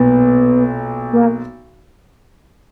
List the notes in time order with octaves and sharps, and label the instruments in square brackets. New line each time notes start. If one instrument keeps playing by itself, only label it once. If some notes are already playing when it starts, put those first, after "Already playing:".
Already playing: [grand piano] B1 A#2 [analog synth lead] B3
[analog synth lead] A#3